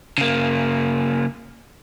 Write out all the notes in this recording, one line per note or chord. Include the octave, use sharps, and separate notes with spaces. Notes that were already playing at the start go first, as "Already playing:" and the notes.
C#3 A#3